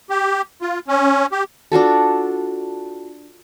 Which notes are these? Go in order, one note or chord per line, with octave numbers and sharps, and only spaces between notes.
G4
F4
C#4
G4
D4 F4 F#4 A4